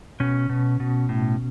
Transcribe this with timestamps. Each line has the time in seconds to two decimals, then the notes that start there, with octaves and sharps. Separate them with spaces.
0.20 B2 C#4
0.49 B2
0.80 B2
1.09 A2